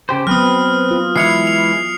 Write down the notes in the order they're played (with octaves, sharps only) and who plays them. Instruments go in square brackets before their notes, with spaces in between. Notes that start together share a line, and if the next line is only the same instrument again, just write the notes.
[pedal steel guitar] C#3 G4 C5
[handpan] F#3 B3 [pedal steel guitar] C4 B4 [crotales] D#6 F6
[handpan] F4
[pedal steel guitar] E3 G#3 E4 [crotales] C7 C#7 F7
[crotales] F7